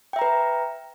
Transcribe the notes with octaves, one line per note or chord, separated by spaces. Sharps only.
B4 E5 G5 A#5